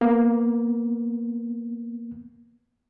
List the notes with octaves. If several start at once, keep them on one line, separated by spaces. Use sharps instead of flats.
A#3 B3